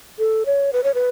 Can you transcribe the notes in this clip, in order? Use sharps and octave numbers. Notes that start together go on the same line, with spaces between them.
A4
C#5
B4
C#5
B4